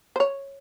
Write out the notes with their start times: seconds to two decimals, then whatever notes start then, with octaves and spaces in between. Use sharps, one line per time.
0.16 C5
0.20 C#5